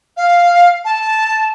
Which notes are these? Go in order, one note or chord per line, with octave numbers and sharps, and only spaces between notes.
F5
A5